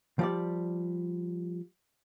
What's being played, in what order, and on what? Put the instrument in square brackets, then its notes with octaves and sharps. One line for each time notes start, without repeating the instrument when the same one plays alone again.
[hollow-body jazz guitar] F3 G3 D5